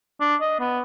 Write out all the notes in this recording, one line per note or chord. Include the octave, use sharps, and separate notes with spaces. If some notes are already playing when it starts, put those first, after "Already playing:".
D4
D#5
B3